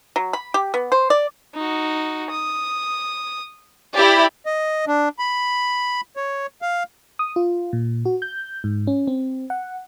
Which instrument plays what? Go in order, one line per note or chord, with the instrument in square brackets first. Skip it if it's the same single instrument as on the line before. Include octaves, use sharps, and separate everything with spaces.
[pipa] F#3
B5
G4
B3
C5
D5
[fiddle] D#4 F#4
D#6
[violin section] E4 G4 [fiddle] D5 B5
[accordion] D#5
D4
B5
C#5
F5
[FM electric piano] D#6
F4
A#2
F#4
G6
G#2
C#4
C4
F#5